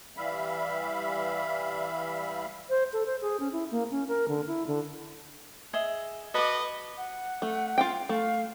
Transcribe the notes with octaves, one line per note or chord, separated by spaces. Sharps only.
E3 G3 E5 F5 B5
C5
A4
C5
G#4
C#4
E4
A#3
C#4
A#4
D3
E4
D3
G#4 D#5 E5
F#4 A4 B4 D#5 D6
F#5
A3
F4 F5 G5
A3 F5